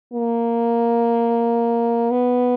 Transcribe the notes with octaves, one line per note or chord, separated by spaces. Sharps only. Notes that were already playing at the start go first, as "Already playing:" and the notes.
A#3
B3